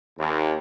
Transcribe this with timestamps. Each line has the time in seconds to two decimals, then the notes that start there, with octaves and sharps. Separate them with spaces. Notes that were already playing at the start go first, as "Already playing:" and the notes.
0.17 D#2